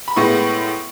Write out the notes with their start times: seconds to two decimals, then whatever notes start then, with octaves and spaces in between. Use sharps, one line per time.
0.08 B5
0.16 A2 G#3 B3 E4 C#6